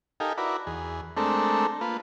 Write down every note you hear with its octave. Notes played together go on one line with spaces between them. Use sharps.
D#4 G4 A4 A#4 F5 G#5
E4 F#4 A#4 B4 D5
E2 G#4
G#3 A3 C4 D4 A4 A#4
A#3 F4 B4